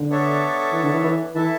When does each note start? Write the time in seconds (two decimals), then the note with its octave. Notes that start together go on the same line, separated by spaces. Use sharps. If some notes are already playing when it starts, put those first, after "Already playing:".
Already playing: D3
0.10 B3 D4 A4 C#5 E5
0.72 E3
0.83 D3
0.93 E3
1.04 E3
1.35 E3 E4 A4 E5 A5